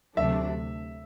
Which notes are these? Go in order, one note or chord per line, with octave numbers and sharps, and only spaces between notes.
D2 C3 F#3 A3 D4 E5